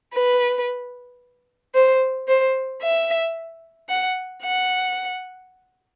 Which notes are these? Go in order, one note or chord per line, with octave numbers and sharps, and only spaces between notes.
B4
C5
C5
E5
F#5
F#5